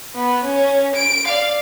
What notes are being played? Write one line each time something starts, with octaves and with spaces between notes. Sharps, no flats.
B3
C#4
D7
D5 F5